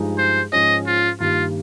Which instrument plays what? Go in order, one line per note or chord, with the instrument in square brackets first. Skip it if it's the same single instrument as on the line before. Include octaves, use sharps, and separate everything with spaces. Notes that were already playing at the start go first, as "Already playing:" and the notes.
Already playing: [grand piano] G2 F3 G#3 D#4
[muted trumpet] C5
[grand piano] G#2 F3 G#3 C#4 [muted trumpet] D#5
[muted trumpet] F4
[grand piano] G2 D#3 G3 A#3 [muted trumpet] F4